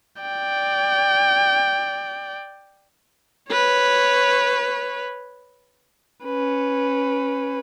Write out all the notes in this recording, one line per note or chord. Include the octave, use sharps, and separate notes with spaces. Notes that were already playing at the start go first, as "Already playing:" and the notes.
D5 G5
B4 C#5
C#4 B4